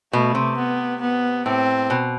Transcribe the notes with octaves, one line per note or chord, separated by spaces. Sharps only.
B2 A3
C3
B3
B3
A2 C4
B2